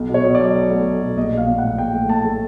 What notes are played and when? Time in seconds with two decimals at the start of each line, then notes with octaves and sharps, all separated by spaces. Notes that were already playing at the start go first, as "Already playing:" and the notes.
Already playing: B1
0.09 B2
0.14 C#5
0.24 B2
0.35 F#3 D5
0.55 B1
0.71 A3
0.86 B1
1.01 B2
1.17 A#1 D#5
1.32 A#1
1.37 F5
1.47 A#1
1.58 F#5
1.63 A2
1.78 A#1 G5
1.93 A3
2.09 A2 A5
2.25 A3